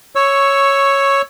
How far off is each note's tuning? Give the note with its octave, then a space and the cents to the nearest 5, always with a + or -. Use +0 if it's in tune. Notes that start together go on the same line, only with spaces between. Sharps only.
C#5 +0 C#6 -10 E6 +0